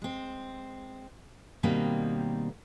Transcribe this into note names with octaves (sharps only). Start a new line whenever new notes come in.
G#3 C4
B2 D#3 G3 A#3 C4